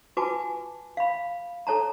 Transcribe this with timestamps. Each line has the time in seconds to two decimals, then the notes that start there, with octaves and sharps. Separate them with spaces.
0.17 F4 F#4 B4 G#5 A5 D6
0.97 F5 B5
1.67 A4 C#5 A5 A#5